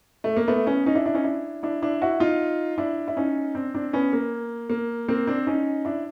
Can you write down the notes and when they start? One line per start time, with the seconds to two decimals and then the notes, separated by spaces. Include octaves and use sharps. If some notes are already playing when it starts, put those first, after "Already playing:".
0.24 A3
0.37 A#3
0.48 A3 B3
0.67 B3 C#4
0.86 C#4 D#4
0.95 D4 E4
1.05 D4 E4
1.14 C#4 D#4
1.24 D4 E4
1.63 D4 E4
1.82 D4 E4
2.02 E4 F#4
2.20 D#4 F4
2.78 D4 E4
3.08 E4
3.17 C#4 D#4
3.55 C4 D4
3.74 C4 D4
3.93 B3 C#4
4.13 A#3
4.70 A#3
5.08 A#3 C4
5.27 C4 D4
5.47 C#4 D#4
5.85 D4 E4